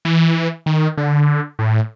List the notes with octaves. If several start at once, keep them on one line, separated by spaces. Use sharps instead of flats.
E3
D#3
D3
A2